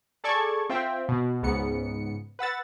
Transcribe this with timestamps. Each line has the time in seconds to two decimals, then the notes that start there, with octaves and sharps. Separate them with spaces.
0.24 G#4 A4 D5 A5 C#6 G#6
0.70 C4 F4 C5 E5 G5
1.09 B2
1.43 C#2 G#2 B3 C#7
2.39 B4 F#5 E6 A6